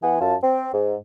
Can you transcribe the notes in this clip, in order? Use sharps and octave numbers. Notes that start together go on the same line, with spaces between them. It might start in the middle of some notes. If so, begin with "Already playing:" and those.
E3 B3 F#5 G#5
F#2 F4 A5
C4
G#2